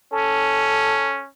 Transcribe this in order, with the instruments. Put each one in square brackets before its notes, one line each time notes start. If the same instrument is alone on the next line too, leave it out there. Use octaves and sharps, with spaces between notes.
[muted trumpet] C#4 [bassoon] A4